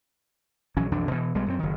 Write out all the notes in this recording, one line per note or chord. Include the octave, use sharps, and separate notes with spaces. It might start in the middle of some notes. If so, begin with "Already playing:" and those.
A#1 E3 F#3 C#4
B1 F2 E3 D4
B2 E3
B1 B2 G3 G#3
F#2 D#3 C4
F#1 D#3